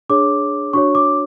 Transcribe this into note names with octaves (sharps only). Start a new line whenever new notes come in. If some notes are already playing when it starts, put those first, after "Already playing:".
D4 G#4 C#5 D6
D4 F#4 C#5 C#6
D6